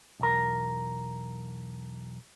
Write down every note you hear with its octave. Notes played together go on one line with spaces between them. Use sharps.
B1 E2 A#4